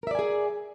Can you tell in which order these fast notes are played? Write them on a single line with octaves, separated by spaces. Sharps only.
A#4 E5 D5 G#5 G#4